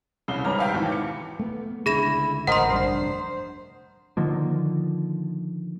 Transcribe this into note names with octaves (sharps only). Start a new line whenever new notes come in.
C2 C#3 C7 G7
G#1 G3 B4 C#5 A#5 F6
E5 F5 G5
D#2 G#2 B2 E3
D6 C#7
A3 B3
C#2 D3 E4 G#4 A#6 E7
A1 A#4 C5 D#5 F#5 C6
F1 G2 D4 C5 C7
D3 D#3 F3 A#3